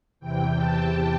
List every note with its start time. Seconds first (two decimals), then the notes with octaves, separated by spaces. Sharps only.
0.20 E2 C3 E3 G5
0.55 A5